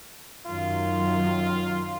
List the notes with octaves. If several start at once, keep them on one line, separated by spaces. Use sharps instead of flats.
F#2 D#3 F#3 F4